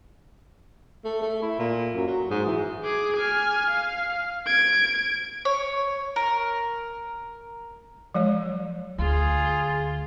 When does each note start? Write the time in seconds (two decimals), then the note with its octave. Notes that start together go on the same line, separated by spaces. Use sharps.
1.05 A3
1.22 A3
1.42 E4
1.59 A#2
1.95 F#2
2.07 F#3
2.31 G#2
2.45 E3
2.84 G#4 D6
3.17 G#5 F6
3.70 F5
4.46 G#6 D7
5.45 C#5
6.16 A#4
8.14 F3 F#3 G#3 C#5
8.98 D2 F4 G#4